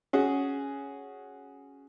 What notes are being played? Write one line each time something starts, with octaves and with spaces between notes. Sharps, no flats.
C#4 F#4 G#4